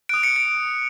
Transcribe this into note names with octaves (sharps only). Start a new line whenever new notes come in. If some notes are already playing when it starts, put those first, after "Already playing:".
D#6 F#6 D7
C#7
D7